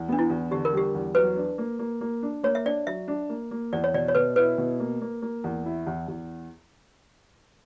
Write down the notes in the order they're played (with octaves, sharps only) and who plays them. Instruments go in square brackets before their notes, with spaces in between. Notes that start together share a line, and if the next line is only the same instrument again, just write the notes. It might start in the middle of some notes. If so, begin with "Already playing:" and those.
Already playing: [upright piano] E2
[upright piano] B3 [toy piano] D4
[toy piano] E4
[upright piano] E2
[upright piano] D3 [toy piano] G4
[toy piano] A#4
[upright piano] G3 [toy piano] G4
[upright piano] E2
[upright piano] F#3 [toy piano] B4
[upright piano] D4
A#3
A#3
A#3
D4
[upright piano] A#3 [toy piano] C#5
[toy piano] E5
[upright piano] D4 [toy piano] D5
[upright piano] F#3 [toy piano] E5
[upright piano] D4
A#3
A#3
[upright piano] E2 [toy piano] D5
[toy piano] C#5
[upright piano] B2 [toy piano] D5
[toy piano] C#5
[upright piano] B2 [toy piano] B4
[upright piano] E4 [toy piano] B4
[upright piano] B2
A#3
A#3
A#3
E2
E4
E2
E2